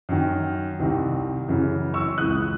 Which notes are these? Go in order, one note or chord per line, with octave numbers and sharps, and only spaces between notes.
F#2 D#3
C2 C3 D#3
F#2 C#3 E3
C#6 E6
C#2 C#3 E3 D#6 F#6